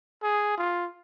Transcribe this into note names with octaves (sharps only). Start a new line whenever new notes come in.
G#4
F4